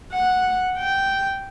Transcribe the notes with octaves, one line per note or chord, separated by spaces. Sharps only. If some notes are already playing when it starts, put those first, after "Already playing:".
F#5
G5